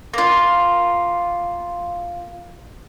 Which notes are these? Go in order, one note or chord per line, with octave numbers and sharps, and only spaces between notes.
A#3 F4